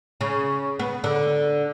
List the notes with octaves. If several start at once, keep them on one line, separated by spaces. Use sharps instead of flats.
C#3
B3
D3